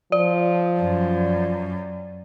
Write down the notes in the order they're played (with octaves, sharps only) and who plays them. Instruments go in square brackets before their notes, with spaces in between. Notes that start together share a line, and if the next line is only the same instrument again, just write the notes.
[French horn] F3 [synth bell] D5
[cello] F#2